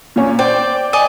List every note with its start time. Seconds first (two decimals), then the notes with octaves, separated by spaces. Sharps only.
0.16 A#2 A#3 C#4
0.39 C5 D5 G5
0.93 D5 D#5 G#5